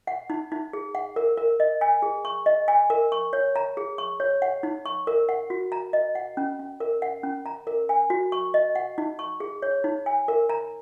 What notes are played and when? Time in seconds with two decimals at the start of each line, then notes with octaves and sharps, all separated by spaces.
0.07 F#5
0.30 D#4
0.52 D#4
0.73 G#4
0.95 F#5
1.16 A#4
1.37 A#4
1.60 D#5
1.81 G#5
2.02 G#4
2.25 C#6
2.46 D#5
2.68 G#5
2.90 A#4
3.12 C#6
3.33 C#5
3.56 A#5
3.77 G#4
3.98 C#6
4.20 C#5
4.42 F#5
4.63 D#4
4.86 C#6
5.07 A#4
5.29 F#5
5.50 F#4
5.72 A#5
5.93 D#5
6.15 F#5
6.37 C#4
6.59 C#4
6.80 A#4
7.02 F#5
7.23 C#4
7.46 A#5
7.67 A#4
7.89 G#5
8.10 F#4
8.32 C#6
8.54 D#5
8.75 F#5
8.98 D#4
9.19 C#6
9.40 G#4
9.62 C#5
9.84 D#4
10.06 G#5
10.28 A#4
10.49 A#5